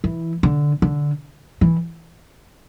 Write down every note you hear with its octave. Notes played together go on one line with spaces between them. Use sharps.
E3
D3
D3
E3